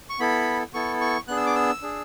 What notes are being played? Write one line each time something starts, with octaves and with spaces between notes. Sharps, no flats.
C#6
B3 E4 A4 B5
B3 E4 A4 C#6
C#6
B3 D4 G#4 F#6
E6
D6
E6
D4 G#4